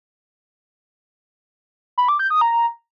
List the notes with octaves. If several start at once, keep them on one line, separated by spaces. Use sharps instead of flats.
B5
D6
G6
D#6
A#5